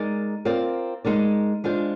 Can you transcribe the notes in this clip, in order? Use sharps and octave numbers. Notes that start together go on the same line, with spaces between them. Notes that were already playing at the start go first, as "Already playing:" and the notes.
Already playing: G#3 D#4 A#4 D5
C4 F4 A#4 D5
G#3 D#4 A#4 D5
G#3 D4 F4 C5